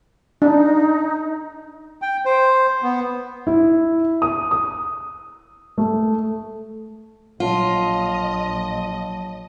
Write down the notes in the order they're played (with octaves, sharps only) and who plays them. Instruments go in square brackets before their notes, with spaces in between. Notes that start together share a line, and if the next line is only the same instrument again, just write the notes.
[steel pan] D4 [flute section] D#4
[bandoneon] G5
C5
B3
[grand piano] E4
D#6
D#6
A3
[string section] A#1 D#5 [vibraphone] F#3 C#5 A5 [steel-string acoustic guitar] F4